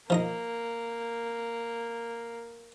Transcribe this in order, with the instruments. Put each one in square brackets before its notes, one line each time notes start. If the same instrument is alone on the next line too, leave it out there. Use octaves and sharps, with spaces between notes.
[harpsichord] F3 D#4 A#5 [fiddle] A#3